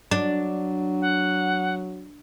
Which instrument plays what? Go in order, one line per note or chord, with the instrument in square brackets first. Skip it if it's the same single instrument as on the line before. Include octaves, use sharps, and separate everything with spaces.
[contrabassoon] F#3 [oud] D4
[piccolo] F#5